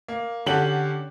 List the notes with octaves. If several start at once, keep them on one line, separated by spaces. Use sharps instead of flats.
A#3
D3 C#4 G4 A4 F#5 F#7